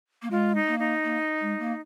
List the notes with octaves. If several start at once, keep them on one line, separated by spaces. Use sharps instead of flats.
A#3
G#3 F4
D#4
A#3
D#4
A#3
G#3
A#3